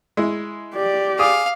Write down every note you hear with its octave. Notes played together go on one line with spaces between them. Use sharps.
G#3 E4
G4 D5
G#4 F5 D6 D#6